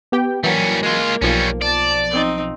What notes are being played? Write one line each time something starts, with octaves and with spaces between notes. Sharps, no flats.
B3 G4 G5
E3 F#3 G3 A#3 C#4
G#3 F4
B1 F3 G3 C#4
D5 A5
C4 D#4